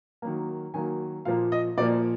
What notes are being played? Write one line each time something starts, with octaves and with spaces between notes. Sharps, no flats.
D#3 F#3 A#3
D#3 F#3 A#3 G#5
A#2 F3 A#3 F5
D#5
A#2 F3 A#3 D5